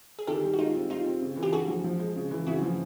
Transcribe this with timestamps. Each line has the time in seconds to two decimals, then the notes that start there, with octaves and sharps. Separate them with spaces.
0.19 G#4
0.27 D#3 G4 A4
0.43 G3
0.54 F#4
0.59 G#3 D#4 F4
0.74 C4
0.90 G3 D#4 F4
1.06 C4
1.22 C#3
1.37 E3
1.43 F4 G4
1.53 D3 F#4 G#4
1.68 F3
1.84 F3
2.00 G#3
2.16 C#3
2.31 E3
2.47 C#3 E4 F#4
2.62 F3